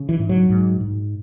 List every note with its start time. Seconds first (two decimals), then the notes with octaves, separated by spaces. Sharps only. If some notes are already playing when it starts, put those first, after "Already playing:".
Already playing: C#3
0.09 E3
0.19 G#2
0.29 F#3
0.50 G#2
0.80 G#2